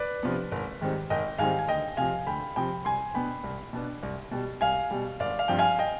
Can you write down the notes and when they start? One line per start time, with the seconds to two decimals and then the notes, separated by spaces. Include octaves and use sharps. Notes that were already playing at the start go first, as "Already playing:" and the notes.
Already playing: B4 D5
0.22 C3 F3 B3 D4
0.52 G#1
0.81 G#2 D#3 G3 C4
1.10 G#1 D#5 G5
1.38 G#2 D#3 G3 C4 F5 G#5
1.59 G#5
1.68 D2 D#5 G5
1.97 C3 F3 F5 G#5
2.27 D2 G5 B5
2.56 C3 F3 G5 B5
2.85 C2 G#5 C6
3.14 B2 B3 D4 G5 B5
3.44 C2
3.73 B2 B3 D4
4.03 C2
4.31 B2 G3
4.61 C2 F5 G#5
4.91 B2 G3
5.20 G#1 D5 F5
5.39 F5
5.48 G2 F3 C4 G5
5.59 F5 G#5
5.79 D#5 G5